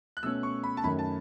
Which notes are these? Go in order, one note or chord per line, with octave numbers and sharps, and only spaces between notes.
F#6
B2 A3 C#4 E6
C#6
B5
A5
F#2 D#3 A3 C#4 B5
A5